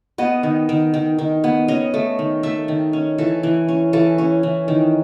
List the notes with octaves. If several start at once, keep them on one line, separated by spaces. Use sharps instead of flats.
B3 D#5
D#3
D#3
D#3
D#3
B3
C#4 D#5
A3
D#3
A3 E5
D#3
C#4
E3 A4
E3
C#4
E3 A4
C#4
E3
D#3